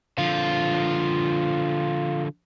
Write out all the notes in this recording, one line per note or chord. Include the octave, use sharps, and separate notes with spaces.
D3 F3 F4